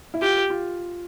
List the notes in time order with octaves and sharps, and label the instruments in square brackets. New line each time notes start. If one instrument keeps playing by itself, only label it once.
[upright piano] E4
[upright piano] F4 [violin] G4
[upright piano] F4